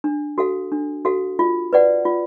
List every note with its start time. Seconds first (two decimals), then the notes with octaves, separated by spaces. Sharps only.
0.04 D4
0.38 F#4 A4 F5
0.72 D4
1.05 F#4 A4 F5
1.39 F4
1.73 B4 D5 F#5
2.05 F4